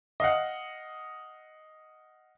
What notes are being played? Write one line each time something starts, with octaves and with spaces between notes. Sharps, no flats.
D#5 F5 F#5